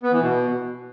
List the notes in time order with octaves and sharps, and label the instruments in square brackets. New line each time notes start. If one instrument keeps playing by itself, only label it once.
[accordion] B3
E3
B2